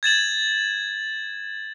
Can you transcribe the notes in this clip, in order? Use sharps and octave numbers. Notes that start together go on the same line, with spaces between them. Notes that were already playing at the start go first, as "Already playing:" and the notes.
G#6 A6 E7 F#7